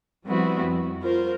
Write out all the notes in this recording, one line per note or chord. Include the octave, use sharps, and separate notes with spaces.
F3 G3 B3 C4 E4 F#4
F2
F4 A#4 C5